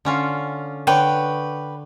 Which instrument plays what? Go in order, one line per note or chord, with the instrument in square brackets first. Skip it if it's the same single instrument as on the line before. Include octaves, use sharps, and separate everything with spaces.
[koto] D3 C#4 F4
[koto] D3 [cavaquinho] B4 C#5 G5